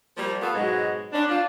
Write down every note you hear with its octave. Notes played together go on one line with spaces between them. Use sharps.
F3 G3 A#3
A3 B3 F4 A4
G#2 B2 F#3 G#3
B3 C#4 D4
D4 F4